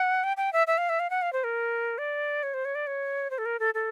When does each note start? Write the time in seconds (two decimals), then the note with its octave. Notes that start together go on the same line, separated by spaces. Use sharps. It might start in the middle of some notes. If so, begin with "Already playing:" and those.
Already playing: F#5
0.24 G5
0.37 G5
0.53 E5
0.67 E5
0.78 F5
0.89 E5
1.00 F5
1.10 F#5
1.22 F5
1.33 C5
1.44 A#4
1.98 D5
2.43 C#5
2.54 C5
2.65 C#5
2.75 D5
2.87 C#5
3.31 C5
3.38 A4
3.46 A#4
3.60 A4
3.74 A4